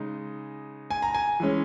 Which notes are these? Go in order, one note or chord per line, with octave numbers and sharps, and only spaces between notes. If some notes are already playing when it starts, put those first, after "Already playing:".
Already playing: C#3 G#3 D#4
G#5
A#5
G#5
E3 G#3 C#4